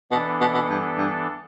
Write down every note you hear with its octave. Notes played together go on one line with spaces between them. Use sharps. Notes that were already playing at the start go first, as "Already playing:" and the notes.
B2 E3 B3 D4 A4
B2
B2
G2
G2